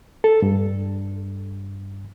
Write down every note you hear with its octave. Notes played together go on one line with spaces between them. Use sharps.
A4
G2